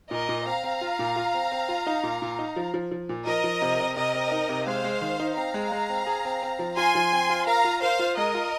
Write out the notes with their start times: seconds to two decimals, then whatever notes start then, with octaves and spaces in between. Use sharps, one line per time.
0.11 A#2 A#4 D#5
0.29 A#2
0.46 C4 F5 A#5
0.64 C4
0.81 F4
0.99 A#2
1.16 F4
1.34 C4
1.51 C4
1.69 F4
1.87 D#4
2.03 A#2
2.22 A#2
2.39 D#4
2.56 F3
2.74 F3
2.91 F3
3.09 A#2
3.26 F3 A#4 D#5
3.44 F3
3.62 C3
3.80 C3
3.96 C3 A#4 D#5
4.15 C4
4.32 D#4
4.49 C3
4.67 G#3 C5 F5
4.84 G#3
5.02 D#3
5.20 D#4
5.36 C4 F5 A#5
5.54 G#3
5.72 G#3
5.89 C4
6.07 G#4
6.25 C4
6.42 C4
6.59 F3
6.77 F4 G#5 C6
6.95 F3
7.12 C4
7.30 F4
7.47 A#4 F5 A#5
7.65 F4
7.82 A#4 C5 F5
7.99 F4
8.17 G#3 A#4 D#5
8.34 F4